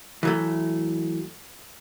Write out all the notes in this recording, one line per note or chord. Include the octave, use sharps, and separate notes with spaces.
E3 F#3 A3